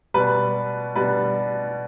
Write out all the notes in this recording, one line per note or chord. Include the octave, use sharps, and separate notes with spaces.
B2 G3 B4
B2 G3 B4